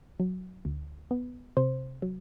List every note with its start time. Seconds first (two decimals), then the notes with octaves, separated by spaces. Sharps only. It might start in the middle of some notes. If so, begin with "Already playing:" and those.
0.20 F#3
0.65 D2
1.11 B3
1.57 C3 C5
2.02 F#3